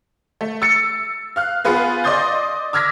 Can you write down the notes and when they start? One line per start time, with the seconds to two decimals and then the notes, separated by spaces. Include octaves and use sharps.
0.41 A3
0.62 E6 A6 C#7
1.36 F5 F6 F#6
1.65 B3 F4 G#4 B4 F5
2.04 D5 D#5 C6 D#6 G6 A6
2.73 D6 E6 F6 G#6 A#6 B6